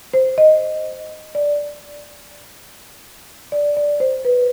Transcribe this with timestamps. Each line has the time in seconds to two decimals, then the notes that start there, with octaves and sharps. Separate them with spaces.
0.14 C5
0.38 D#5
1.35 D5
3.52 D5
3.77 D5
4.00 C5
4.25 B4